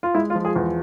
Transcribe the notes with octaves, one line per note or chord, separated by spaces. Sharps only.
F4
G#3 E4
F4
F3
G#4
E2